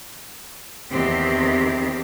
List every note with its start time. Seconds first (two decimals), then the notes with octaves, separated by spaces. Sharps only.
0.90 E2 D#3 C4 G4